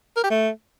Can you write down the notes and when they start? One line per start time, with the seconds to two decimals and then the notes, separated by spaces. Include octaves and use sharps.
0.17 A#4
0.24 G4
0.30 A3